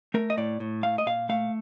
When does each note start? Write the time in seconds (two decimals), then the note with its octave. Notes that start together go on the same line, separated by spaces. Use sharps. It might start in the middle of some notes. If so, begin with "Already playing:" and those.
0.14 A3 A#4
0.30 D#5
0.37 A2 D5
0.60 A2
0.83 A3 F5
0.98 D#5
1.06 A#2 F5
1.29 A3 F5